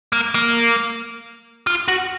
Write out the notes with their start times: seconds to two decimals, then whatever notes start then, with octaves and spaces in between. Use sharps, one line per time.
0.13 A#3
0.35 A#3
1.67 F4
1.88 F#4